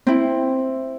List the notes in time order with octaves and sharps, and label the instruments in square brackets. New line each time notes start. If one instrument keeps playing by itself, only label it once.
[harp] C4 E4